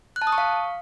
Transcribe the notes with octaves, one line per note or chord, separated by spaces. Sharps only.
F#6
A5
D#6
C#6
F5